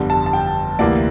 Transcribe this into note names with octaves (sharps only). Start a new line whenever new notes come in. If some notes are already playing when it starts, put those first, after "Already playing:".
Already playing: G1 F2 D3 G3
A5
A5
G5
D2 C3 E3 A#3 D5